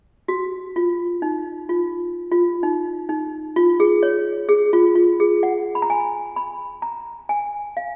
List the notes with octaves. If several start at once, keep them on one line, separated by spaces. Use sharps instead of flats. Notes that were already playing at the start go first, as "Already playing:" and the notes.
F#4
F4
D#4
F4
F4
D#4
D#4
F4
G#4
C#5
G#4
F4
F4
G#4
F#5
B5
A#5
G#5
B5
A#5
G#5
F5